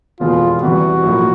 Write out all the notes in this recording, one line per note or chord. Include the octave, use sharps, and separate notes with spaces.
F1 E2 B2 G#3 F4
E2 C3 E3 G3 F#4
B1 A2 F3 A#3